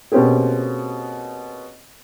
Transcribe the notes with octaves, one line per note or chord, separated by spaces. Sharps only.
B2 A#3 C4 C#4 G4 G#4